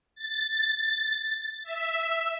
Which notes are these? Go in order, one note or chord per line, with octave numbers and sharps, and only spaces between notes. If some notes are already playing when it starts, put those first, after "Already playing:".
A6
E5